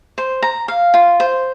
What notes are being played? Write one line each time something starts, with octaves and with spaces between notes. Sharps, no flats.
C5
A#5
F5
F4
C5